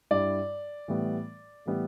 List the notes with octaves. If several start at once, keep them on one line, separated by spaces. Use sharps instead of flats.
G2 G3 E4 D5
A2 E3 G3 B3
A2 E3 G3 B3